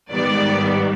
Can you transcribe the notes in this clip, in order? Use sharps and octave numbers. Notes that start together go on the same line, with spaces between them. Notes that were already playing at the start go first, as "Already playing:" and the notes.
G#2 D#3 G3 B3 D5